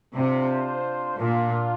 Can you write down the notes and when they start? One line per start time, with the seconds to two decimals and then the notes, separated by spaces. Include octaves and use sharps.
0.16 C3 D4 F4 C5
1.18 A#2 A#3 D4 F4